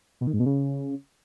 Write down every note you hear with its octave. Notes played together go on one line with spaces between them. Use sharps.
B2
D#3
G#2
B2
C#3